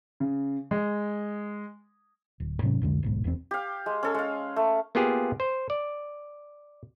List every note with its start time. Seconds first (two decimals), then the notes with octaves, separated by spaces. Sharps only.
0.20 C#3
0.71 G#3
2.40 D1
2.62 G#2 C3 F#3 C#4
2.82 C2 F2 D3 G#3
3.03 D1 B1 G#2
3.24 E1 E2 A#2 C4
3.51 G4 F5
3.86 G#3
4.03 C#4 A4
4.14 G#3 F5
4.56 A3
4.95 A#3 B3 F4 G4 G#4
5.40 C5
5.70 D5